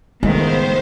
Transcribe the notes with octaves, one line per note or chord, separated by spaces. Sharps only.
C#2 A2 D#3 G#3 B3 C5